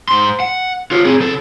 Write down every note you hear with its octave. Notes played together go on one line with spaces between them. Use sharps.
G#2 C6
F#5
F4 C#5
C4 G#4
C#3 A4